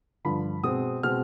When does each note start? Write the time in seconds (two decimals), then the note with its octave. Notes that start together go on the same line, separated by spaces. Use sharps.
0.25 G2 D3 F3 B5
0.63 B2 G#3 C4 D#6
1.03 B2 G#3 C4 F6